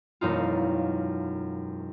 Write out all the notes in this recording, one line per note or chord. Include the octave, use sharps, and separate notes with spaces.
E1 F#2 D#4 F4